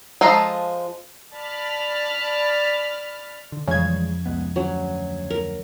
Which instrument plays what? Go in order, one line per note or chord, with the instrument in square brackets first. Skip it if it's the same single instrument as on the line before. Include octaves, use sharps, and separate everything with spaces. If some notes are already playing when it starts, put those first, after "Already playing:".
[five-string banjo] F3 G#3 A4 F5 A#5
[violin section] D5 A5 B5 F6
[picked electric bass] D3
[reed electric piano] F2 F3 [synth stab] C#3 G#6 [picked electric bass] E3 G3 G#3
[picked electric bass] C2 G#3 B3
[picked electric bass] D2 C#4 [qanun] F#3
[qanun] A#4